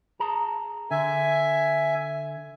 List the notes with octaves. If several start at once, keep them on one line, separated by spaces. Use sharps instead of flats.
G#4 A5 A#5
D3 E5 G#5